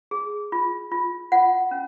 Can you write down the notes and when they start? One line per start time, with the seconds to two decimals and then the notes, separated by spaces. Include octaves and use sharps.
0.11 G#4
0.52 F4
0.92 F4
1.32 F4 F#5
1.71 C#4